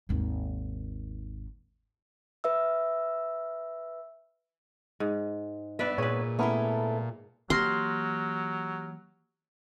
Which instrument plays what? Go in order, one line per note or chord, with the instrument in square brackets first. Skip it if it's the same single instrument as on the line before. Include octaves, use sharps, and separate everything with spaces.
[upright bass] G#1 D#2
[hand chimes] B4 E5 E6
[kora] G#2
[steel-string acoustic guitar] G2 B3 [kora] B4 D5 E5
[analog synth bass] A#2 [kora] G#4 B4 [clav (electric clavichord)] C#5
[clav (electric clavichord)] A3 B3 A#4 [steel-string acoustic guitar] C#4 E4 A4
[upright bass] E3 A#3 [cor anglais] F#3 [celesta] G4 F6 A#6 [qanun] C6